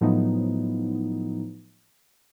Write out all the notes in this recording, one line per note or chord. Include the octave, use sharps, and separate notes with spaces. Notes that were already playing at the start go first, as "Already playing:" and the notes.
A2 F3 F#3 B3 D#4